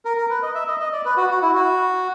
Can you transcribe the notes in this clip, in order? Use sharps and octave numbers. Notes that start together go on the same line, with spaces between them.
A#4
A#4
B4
D#5
E5
D#5
D#5
D5
B4
F#4
F#4
E4
F#4